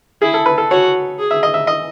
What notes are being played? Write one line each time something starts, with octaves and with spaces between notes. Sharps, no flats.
E4 G#4
A4
B4
A4
F#4 C#5
G#4
E5
D#5
E5
D#5